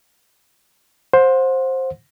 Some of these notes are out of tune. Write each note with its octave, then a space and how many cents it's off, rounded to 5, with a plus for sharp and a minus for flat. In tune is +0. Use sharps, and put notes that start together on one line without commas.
C5 +10 F#5 -35